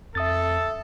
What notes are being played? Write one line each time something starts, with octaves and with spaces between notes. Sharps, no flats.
F2 A4 E5 D#6 A6